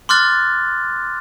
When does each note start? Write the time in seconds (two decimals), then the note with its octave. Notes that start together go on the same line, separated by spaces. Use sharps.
0.09 C6 D6 F6 F#6 A6